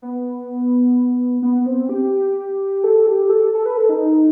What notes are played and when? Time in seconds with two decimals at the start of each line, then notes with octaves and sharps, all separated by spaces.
0.02 B3
1.42 B3
1.66 C4
1.89 G4
2.84 A4
3.07 G4
3.29 A4
3.54 A4
3.66 B4
3.77 A4
3.89 D#4